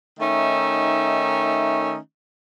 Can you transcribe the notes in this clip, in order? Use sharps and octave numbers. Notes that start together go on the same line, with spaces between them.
D#3 A3 C#4 D#4 E5